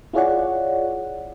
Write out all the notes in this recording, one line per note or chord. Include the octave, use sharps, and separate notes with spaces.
E4 F4 G#4 C#5 D5 F#5